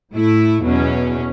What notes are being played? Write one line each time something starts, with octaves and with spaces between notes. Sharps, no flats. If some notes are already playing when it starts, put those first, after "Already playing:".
A2 A3 E4
E2 B2 F#3 C#4